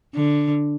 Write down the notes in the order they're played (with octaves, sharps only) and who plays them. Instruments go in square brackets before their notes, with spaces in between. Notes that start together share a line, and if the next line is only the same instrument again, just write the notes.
[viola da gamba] D3